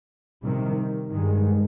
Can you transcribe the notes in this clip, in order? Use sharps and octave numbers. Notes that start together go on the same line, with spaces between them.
C3 D#3 G3
G2 D#3 G#3